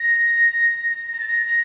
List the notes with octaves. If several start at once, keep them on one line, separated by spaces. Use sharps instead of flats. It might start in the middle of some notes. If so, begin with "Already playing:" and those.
Already playing: A#6
A#6
A6
A#6
A#6